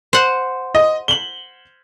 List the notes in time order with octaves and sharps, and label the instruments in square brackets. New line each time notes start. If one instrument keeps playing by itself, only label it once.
[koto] C5 F#5
[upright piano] D#5
F#7 G7